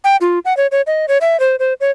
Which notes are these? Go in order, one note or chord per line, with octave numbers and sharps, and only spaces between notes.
G5
F4
F#5
C#5
C#5
D#5
C#5
E5
C5
C5
C#5